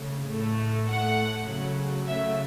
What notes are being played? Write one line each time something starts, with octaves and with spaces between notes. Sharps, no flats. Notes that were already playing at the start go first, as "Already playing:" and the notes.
Already playing: C#3 A3
A2 A3
A2 A3 F#5
C#3 F#3 A3
C#3 F#3 A3 E5